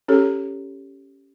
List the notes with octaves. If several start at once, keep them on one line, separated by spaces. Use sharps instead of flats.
C#4 G4 A4 C#5